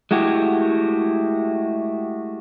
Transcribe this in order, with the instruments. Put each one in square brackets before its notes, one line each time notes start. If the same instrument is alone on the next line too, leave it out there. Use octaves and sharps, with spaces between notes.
[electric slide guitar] G#3 A3 E4 F#4 G4